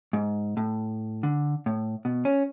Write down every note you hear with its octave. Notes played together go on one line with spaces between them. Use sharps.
G#2
A2
D3
A2
B2
C#4